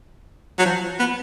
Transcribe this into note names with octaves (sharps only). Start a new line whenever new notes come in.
F#3
F3
B3